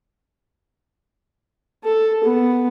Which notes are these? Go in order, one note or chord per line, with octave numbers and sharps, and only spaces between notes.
A4
B3